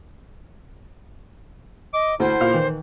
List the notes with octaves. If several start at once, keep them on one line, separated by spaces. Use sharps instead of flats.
D#5 D6
D2 E4 C5
A#2 F5
D#3 E3